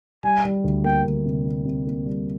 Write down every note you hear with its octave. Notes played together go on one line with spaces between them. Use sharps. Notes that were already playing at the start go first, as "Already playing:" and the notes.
G3 G#5
G3
D2
A#3 G5
D2
C3
A#3
C3
A#3
G3